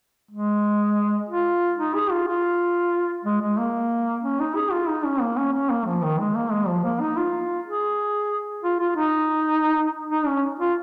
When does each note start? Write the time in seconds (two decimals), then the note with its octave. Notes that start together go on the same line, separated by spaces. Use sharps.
0.31 G#3
1.29 F4
1.78 D#4
1.95 G#4
2.11 F4
2.27 F4
3.25 G#3
3.41 G#3
3.58 A#3
4.23 C#4
4.40 D#4
4.55 G#4
4.72 F4
4.88 D#4
5.05 C#4
5.21 A#3
5.37 C#4
5.53 C#4
5.70 A#3
5.86 F3
6.02 D#3
6.19 G#3
6.35 A#3
6.52 G#3
6.68 F3
6.84 A#3
7.00 D#4
7.17 F4
7.66 G#4
8.63 F4
8.80 F4
8.96 D#4
10.11 D#4
10.27 C#4
10.60 F4